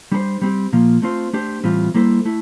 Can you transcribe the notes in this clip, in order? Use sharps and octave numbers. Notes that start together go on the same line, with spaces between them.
G3 D4 A4 C5
G3 C4 G4
A#2 F3 A#3 F4
A3 C4 F4 C5
A3 D4 G4 C5
A2 E3 G3 C4 F4
G3 A#3 E4 A4 C5
A3 E4